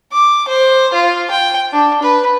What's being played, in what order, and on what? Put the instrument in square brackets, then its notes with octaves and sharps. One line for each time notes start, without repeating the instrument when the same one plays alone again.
[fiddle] D6
C5
F4
G5
D4
B4